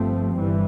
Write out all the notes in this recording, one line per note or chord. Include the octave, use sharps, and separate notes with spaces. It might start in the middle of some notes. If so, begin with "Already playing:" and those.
Already playing: G1 G2 F3 A3 C4
G1 G2 E3 G3